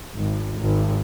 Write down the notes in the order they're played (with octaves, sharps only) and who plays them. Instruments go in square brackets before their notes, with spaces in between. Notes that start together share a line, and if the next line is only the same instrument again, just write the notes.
[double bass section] G#1
G#1